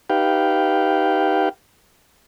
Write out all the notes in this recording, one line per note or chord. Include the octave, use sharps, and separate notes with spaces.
D#4 G4 B4 F5 G5